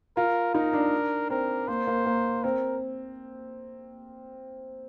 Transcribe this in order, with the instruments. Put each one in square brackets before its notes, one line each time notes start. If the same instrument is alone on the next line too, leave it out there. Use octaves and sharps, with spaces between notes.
[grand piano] F4 [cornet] A#4
[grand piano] D#4 [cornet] A#4
[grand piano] D4
[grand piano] C4 [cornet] A#4
[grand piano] A#3 [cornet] C5
[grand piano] A#3
A#3
[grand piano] C4 [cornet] A#4